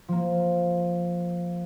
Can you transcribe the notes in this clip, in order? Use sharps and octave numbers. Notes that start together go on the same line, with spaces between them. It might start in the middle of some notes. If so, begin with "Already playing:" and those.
F3 A#3